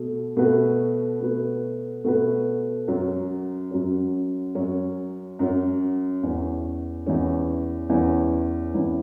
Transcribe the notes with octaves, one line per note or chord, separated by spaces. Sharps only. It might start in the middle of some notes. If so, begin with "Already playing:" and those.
Already playing: B2 A3 F#4
B2 A3 F#4 B4
B2 A3 F#4 B4
B2 A3 F#4 B4
F#2 F#3 C#4
F#2 F#3 C#4
F#2 F#3 C#4
F#2 F#3 C#4
E2 E3 C#4
E2 E3 C#4
E2 E3 C#4
E2 E3 C#4